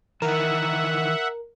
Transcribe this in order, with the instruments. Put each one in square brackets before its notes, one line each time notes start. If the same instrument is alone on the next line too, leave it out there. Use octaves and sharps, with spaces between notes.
[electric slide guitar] D#3 E3 [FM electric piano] A#4 [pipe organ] E5 F#5